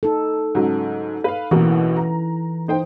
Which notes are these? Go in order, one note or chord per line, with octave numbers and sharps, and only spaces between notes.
D#4 A4
G#2 C#3 F#3
B4 F5
A1 B2 E3 A#3
A#5
D#4 C5 G5